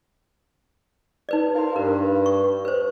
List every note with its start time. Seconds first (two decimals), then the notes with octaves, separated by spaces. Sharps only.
1.29 D#4 B4 D5
1.55 A#4 C5 F5
1.76 G2 A#4
2.26 C#6
2.65 B4 C5